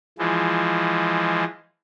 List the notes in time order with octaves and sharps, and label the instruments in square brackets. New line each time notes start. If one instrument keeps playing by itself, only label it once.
[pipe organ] E3 F3 G#3